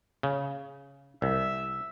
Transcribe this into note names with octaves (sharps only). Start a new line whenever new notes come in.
C#3
C2 E5